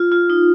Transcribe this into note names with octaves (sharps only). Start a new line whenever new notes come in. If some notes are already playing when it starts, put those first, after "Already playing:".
Already playing: F4
F4
D#4